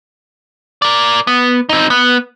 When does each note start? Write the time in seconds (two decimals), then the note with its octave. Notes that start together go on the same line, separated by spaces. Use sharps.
0.82 A#4 D5
1.27 B3
1.69 C4 D#4
1.90 B3